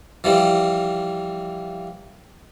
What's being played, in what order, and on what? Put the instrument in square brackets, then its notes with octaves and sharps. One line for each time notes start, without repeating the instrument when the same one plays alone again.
[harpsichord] E3 F3 G3